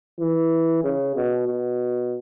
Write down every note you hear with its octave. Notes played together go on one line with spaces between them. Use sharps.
E3
C#3
B2
B2